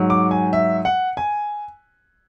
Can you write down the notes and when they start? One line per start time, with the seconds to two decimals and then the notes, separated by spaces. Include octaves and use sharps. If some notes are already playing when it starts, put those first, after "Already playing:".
Already playing: G#2 F#3
0.10 D6
0.31 G#5
0.53 E5
0.85 F#5
1.17 G#5